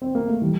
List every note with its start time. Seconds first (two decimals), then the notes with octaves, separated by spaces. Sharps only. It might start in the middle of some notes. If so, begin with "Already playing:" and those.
0.02 C4
0.15 A#3
0.28 A3
0.42 E3 G3